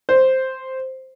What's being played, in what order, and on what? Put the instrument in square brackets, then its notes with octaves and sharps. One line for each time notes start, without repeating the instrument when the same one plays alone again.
[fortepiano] C5